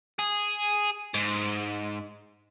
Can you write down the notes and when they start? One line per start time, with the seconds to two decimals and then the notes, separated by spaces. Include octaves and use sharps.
0.19 G#4
1.14 G#2